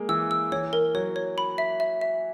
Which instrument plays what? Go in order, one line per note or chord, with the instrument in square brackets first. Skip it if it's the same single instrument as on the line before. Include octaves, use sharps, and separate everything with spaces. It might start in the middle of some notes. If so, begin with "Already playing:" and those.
Already playing: [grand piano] G#3 A#3
[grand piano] E3 [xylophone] E6
[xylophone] E6
[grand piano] E3 [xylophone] C#5
[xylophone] A#4
[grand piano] F#3 [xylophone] C#5
[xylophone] C#5
B5
E5
E5
E5